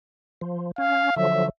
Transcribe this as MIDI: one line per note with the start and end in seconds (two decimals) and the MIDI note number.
0.41 0.71 53
0.78 1.10 61
0.78 1.14 77
1.16 1.49 50
1.16 1.49 53
1.16 1.49 54
1.16 1.46 76